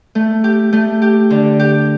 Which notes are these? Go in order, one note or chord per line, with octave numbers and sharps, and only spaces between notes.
A3
G4
A3
G4
D3
G4